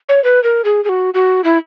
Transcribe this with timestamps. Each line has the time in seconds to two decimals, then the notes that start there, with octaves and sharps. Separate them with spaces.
0.09 C#5
0.24 B4
0.43 A#4
0.64 G#4
0.84 G#4
0.89 F#4
1.14 F#4
1.44 E4